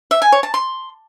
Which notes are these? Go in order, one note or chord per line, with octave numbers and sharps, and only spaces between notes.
E5
G#5
C#5
A5
C6